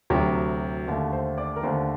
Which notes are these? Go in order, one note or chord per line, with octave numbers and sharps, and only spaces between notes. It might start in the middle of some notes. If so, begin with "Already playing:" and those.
D2 C3 F#3 G4
D#2 D3 A3
C5
D5
A#4
D#2 D3 A3 C5